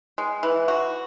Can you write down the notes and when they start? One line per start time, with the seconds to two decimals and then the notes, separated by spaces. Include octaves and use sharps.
0.18 G#3
0.43 E3
0.68 F#4